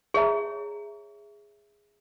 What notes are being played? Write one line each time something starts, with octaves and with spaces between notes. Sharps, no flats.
G#4 C#5 E5 A#5